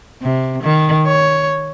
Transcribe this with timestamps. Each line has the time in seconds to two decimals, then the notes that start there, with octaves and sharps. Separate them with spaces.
0.22 C3
0.63 D#3
1.06 C#5